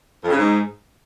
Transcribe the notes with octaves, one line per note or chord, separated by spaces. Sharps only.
F2
C#3
G#2